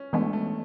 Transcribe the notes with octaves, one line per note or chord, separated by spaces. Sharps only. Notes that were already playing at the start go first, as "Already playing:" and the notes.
Already playing: C#4
E3 G#3 A3 B3 D4
A3